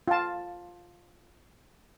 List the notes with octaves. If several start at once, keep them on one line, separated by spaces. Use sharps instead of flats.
F4 A5